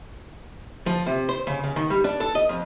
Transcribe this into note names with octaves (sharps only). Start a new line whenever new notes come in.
F3
C3
C5
C#3
C#3
D#3
G3
D4
A4
D#5
F2